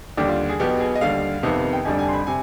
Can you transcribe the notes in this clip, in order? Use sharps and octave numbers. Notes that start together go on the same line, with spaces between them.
D#2 D3 G3 D4 G4
F4
G#4
B1 B2 B3 G4
G#4
D#5
D#2 D3 G3 F5
F2 C3 D#3 B3
G5
F1 F2 D3 G3 D4 G#5
G#5
C6
B5
C3 G#5